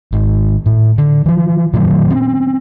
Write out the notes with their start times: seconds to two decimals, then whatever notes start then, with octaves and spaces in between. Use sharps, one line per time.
0.12 G#1
0.66 A2
0.98 D3
1.26 E3 F3
1.73 A#2 D#3 F#3 A3
2.10 C4 C#4